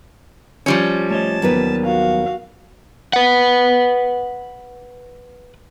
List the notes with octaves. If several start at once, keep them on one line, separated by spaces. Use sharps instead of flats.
F3 G3 C#4
A3 C#5 D#5 A5
D#2 F#3 B3 A#4 B4
F#4 F5
B4 F#5